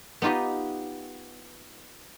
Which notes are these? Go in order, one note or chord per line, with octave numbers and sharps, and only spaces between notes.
B3 D#4 F4 G4 D#5